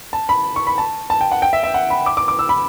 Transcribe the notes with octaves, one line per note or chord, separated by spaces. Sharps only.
A5
B5
C#6
B5
A5
A5
G5
F#5
G5
E5
E5
F#5
B5
D6
D6
D6
E6
B5